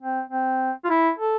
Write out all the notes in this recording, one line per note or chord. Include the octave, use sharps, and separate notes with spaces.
C4
C4
F4
E4
A4